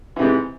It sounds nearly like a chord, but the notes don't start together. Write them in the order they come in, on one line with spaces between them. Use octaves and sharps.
E3 C3 G#2